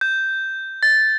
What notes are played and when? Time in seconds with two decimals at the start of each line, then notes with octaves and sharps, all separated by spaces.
0.01 G6
0.83 A6